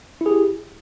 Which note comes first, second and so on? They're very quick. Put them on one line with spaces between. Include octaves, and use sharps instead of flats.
E4 G#4 G4